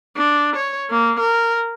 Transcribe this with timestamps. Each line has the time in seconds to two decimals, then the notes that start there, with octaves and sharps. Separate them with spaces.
0.16 D4
0.56 C#5
0.90 A#3
1.19 A#4